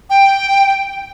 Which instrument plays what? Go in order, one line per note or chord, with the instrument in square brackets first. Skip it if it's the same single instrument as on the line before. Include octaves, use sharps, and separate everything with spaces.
[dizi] G5